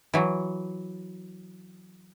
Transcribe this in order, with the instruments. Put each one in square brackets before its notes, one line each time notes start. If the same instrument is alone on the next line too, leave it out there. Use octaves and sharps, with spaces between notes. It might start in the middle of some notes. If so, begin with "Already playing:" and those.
[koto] E3 F#3